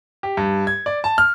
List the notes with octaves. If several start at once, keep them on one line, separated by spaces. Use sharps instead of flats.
G4
G2
G#6
D5
A5
F6